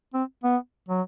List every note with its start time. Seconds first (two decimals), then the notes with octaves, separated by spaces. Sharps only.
0.14 C4
0.44 B3
0.89 F#3